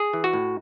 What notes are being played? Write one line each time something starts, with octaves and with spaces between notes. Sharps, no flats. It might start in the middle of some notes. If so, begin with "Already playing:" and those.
Already playing: G#4
E3
F#4
A2